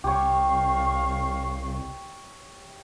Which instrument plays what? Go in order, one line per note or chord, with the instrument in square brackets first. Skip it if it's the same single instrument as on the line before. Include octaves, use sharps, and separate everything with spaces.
[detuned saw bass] C2 [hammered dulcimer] G4 C#5 [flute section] F5 C#6